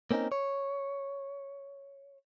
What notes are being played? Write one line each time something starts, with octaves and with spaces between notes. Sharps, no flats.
A#3 C4 C#4 D#4 A#4
C#5